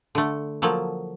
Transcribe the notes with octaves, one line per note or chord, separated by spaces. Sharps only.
D3 A3
F3 F#3 A#3 A4